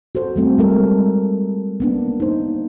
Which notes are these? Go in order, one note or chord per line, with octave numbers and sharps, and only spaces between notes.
F#4 A4 C5
G3 A3 C4
G3 G#3 A4 A#4
A#3 B3 D4
D#4 C5